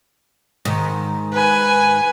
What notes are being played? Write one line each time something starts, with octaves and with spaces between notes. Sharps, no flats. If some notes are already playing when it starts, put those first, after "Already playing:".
G#2 D#3
B4 G#5